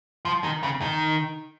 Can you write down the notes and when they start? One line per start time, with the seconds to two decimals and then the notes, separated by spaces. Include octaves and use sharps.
0.25 F3
0.44 D#3
0.63 C#3
0.82 D#3